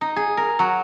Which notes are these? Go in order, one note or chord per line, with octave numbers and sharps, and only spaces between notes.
D#4
G#4
A#4
F#3